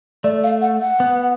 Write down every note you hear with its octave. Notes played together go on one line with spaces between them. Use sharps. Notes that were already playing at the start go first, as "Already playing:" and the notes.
A3 D5
F5
F#5
F#5
B3